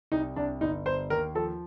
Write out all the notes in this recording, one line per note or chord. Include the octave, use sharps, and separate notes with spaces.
C2 D#4
C2 D4
G1 D#4
G1 C5
D#2 A#4
F3 A4